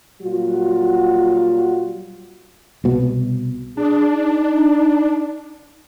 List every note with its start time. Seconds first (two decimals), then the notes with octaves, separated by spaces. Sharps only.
0.22 A#2 F#3 G3 F4 F#4
2.84 C2 B2
3.77 D4 G#4
4.10 D#4